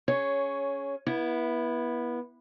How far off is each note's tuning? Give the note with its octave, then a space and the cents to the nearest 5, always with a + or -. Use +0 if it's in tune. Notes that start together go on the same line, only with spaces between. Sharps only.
C#4 +10 G#4 +5 C#5 +0
B3 -25 E4 +0